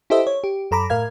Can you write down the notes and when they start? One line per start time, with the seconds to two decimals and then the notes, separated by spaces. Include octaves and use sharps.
0.10 E4 G4 A4 C5 D#5 E5
0.27 C#5
0.44 G4
0.71 F#2 A4 A#5 B5 D6
0.90 A2 A#4 F5 G#6